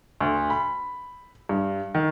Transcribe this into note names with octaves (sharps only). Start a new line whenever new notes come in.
D2
B5
G2
D#3